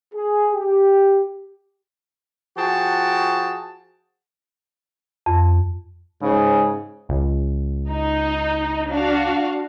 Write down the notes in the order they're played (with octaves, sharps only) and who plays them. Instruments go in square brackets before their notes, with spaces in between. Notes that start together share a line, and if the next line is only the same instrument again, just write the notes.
[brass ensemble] G#4
G4
[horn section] F3 F#4 G#4 G5 A5
[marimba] F2
[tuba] G#2 [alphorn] C#3
[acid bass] C#2
[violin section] D#4
D4 F#4 F5